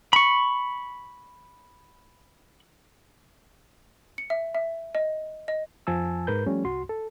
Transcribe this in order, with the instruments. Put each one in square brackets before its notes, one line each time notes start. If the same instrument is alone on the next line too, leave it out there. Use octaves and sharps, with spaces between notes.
[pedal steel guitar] B5 C#6
[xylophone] C#7
E5
E5
D#5
D#5
[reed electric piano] F2 F3 G#5 A5 E6
G#2 A#4 B4 G6
F3 G3 A3 C#4
C2 F#4 C6
A4